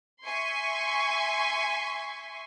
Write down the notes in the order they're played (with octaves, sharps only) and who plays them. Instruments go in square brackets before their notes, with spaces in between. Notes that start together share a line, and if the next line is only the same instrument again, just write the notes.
[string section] E5 G#5 C6 C#6